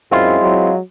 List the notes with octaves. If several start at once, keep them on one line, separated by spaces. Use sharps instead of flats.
F#2 G#3 C4 E4 F4
F#3